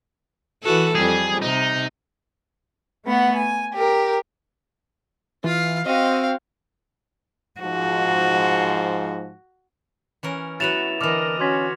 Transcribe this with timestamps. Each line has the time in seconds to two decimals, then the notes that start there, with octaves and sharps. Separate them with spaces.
0.63 E3 F#4 A4
0.95 F2 G3 G#4
1.42 C3 D#4
3.05 A3 B3 F#5
3.35 G#5
3.75 G4 A#4
5.44 E3 F4 F5
5.86 C4 F#4 D#5 F5
7.60 G#2 F3 F#4
10.23 E3 C#4 A#4
10.60 F#3 B3 E4 F#4 B4 A6 E7 F7
11.01 D3 E3 A#4 D#5 D6 F6 F7
11.40 C#4 F#4 C6 G#6 B6